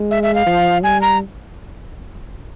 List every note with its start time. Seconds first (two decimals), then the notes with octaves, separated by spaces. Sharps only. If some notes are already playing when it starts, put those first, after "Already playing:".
Already playing: G#3
0.11 E5
0.23 E5
0.35 F5
0.47 F3
0.83 G3 G#5
1.01 A#5